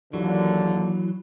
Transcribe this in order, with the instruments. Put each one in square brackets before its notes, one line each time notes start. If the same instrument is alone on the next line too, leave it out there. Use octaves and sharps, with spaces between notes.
[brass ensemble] D#2 A#2 D3 [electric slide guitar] E3 F#3